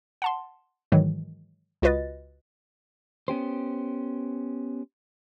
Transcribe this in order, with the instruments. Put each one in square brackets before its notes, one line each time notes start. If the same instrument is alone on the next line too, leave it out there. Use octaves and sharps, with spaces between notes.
[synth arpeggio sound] F#5 A5 C6
G#2 D#3 E3 F#3 G#3
C#2 F4 F#4 B4 D#5 A6
[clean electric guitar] B3 C#4 G4 C5